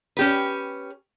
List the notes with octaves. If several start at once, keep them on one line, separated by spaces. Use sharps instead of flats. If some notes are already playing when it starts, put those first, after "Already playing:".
C#4 G4 B4